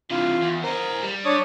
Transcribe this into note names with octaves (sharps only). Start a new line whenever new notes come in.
C3 E3 F4
E2
A#4 C5 D#5
G3
D4 C#5 D#6